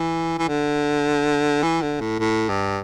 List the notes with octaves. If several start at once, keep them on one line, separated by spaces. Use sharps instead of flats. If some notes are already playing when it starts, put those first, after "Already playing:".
Already playing: E3
E3
D3
E3
D3
A2
A2
G2